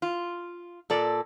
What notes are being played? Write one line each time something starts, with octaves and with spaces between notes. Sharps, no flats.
F4
A#2 A4 D5